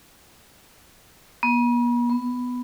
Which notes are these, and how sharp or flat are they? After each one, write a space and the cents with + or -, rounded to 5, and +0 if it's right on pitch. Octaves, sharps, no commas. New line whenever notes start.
B3 -45
B3 +5